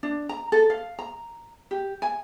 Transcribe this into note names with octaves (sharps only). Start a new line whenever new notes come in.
D4
A#5
A4
F5
A#5
G4
G#5